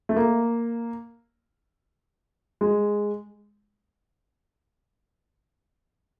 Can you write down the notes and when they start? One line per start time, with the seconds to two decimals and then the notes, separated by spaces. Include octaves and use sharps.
0.09 A3
0.16 A#3
2.61 G#3